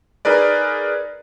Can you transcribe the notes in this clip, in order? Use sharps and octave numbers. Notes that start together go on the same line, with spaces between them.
D#4 G#4 A#4 B4 D5